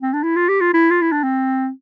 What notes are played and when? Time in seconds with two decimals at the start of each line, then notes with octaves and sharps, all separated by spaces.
0.03 C4
0.13 D4
0.24 E4
0.36 F4
0.49 G4
0.61 F4
0.74 E4
0.91 F4
1.02 E4
1.12 D4
1.23 C4